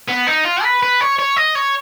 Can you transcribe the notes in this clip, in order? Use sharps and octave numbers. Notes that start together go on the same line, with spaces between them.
B3
D#4
F4
B4
B4
C#5
C#5
D#5
C#5